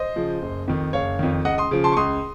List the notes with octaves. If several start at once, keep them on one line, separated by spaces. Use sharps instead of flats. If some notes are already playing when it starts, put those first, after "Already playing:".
Already playing: C5 D#5
C#3 F3
F#1
F2 D#3
F#1 C#5 F5
F2 D#3
C#2 D#5 F#5
C6 D#6
C#3 F3
A5 C6
C#6
C#2 C6 D#6